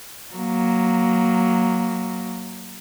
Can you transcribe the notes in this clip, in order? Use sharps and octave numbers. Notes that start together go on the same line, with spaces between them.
F#3 A#3